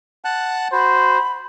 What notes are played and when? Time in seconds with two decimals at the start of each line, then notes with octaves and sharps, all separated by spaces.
0.25 F#5 A5 F#6
0.73 F#4 C5 B5